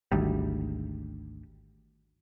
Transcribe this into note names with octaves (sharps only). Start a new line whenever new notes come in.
G#1 D2 G3